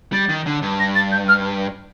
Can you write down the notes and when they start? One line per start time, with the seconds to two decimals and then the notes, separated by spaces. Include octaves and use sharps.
0.13 G3 A6
0.29 D#3
0.46 D3
0.62 G2
0.80 A#6
0.95 A6
1.12 G6
1.28 F6